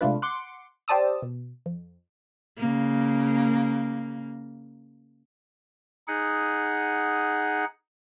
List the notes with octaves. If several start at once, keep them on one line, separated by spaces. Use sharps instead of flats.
C3 G#3 A3 D4 F4 B4
F#5 C6 D6 C#7
G4 C5 D5 A5 D#6 E6
B2
F2
C#3 A#3
D#4 G#4 F#5